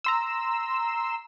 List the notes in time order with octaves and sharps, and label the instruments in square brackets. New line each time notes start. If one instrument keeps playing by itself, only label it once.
[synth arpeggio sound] A#5 C6 E6